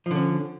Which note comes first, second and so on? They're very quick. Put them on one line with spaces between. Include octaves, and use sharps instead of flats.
F3 D3 C#4